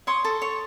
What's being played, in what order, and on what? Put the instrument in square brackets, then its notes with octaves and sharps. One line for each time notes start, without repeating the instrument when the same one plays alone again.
[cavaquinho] C#5 C6 D#6
A4
C#5